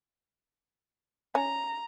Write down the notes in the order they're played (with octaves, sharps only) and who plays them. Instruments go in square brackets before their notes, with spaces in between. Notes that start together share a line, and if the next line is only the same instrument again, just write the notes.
[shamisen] C#4 [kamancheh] A#5